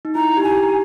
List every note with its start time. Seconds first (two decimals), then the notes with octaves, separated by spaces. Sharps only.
0.05 D#4
0.15 E4 A#5
0.37 G4
0.43 G#5
0.57 G4